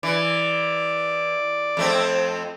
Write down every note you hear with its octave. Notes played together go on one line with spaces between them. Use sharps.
E3 D5
F2 A3 C4